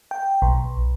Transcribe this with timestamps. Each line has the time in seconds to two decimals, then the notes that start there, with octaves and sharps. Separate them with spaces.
0.11 G5
0.42 B1